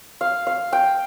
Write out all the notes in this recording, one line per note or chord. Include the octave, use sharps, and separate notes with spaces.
F5
F5
G5